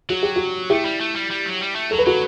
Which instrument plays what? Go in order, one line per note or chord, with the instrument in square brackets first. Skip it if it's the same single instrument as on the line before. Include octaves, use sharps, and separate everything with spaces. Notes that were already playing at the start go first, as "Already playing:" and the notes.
[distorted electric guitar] F#3 [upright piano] F#4
[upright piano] G4
F#4
[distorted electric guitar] A3 [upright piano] E4 G4
[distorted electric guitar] G3
A3
G3
G3
F#3
G3
A3
[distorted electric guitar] F#3 [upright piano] A4
[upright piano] B4
[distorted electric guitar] F#3 [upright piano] F#4 A4